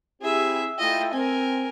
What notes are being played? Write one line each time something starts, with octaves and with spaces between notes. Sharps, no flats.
C4 E4 G4 G#4 E5
A3 E4 F4 D#5 G5
C4 A#4 G#5